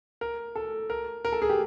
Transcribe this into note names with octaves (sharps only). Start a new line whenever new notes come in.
A#4
A4
A#4
A#4
A4
G#4
G4